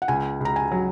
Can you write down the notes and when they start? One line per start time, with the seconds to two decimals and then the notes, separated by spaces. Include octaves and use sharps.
0.02 F#5
0.08 C#2 G#5
0.40 C#2 A#5
0.56 G#5
0.71 F#3